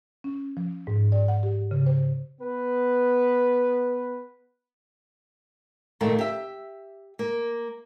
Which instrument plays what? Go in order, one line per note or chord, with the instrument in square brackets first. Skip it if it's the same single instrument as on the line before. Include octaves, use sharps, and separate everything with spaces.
[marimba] C#4
F3
G#2
D5
F#5
G4
C#3
C5
[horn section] B3 B4
[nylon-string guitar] A#2 D#3 A3 A#3 A#4
G4 E5
A#3